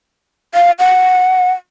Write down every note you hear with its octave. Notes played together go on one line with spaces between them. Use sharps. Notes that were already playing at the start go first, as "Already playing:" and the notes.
F5
F#5